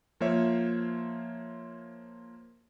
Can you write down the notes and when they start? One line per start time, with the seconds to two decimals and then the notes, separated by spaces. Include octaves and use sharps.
0.20 F3 A#3 F4 C5 C#5 E5